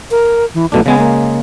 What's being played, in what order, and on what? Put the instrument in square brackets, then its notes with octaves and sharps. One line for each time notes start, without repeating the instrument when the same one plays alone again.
[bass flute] A#4
E3
[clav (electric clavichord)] B1 B2 D4 [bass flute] A3
[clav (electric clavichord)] C#3 G#3 G#5 [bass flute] B3
[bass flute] A#3